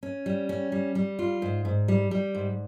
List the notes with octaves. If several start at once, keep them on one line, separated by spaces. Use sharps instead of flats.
C#4
G3
C#4
G3
G3
F4
G#2
G#2
G3
G3
G#2